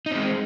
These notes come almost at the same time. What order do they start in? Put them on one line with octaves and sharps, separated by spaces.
D#4 C4 G#3